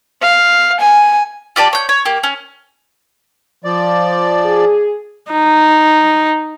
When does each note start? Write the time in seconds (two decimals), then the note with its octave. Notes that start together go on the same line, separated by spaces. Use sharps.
0.21 F5
0.80 G#5
1.56 F4 G4 D5 A5
1.73 C#5 G6
1.89 C#5
2.05 A#3 G4
2.23 C#4
3.64 F3 D5
4.46 G#4
5.32 D#4